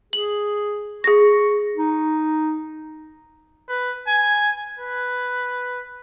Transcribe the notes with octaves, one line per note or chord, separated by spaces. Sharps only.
G#4 F#7
G#4 C#6 A#6
D#4
B4
G#5
B4